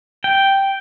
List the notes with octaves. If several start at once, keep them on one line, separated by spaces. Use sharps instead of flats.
G5